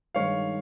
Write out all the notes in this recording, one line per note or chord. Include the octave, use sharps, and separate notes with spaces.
G2 D#3 G#3 D#4 C#5 F5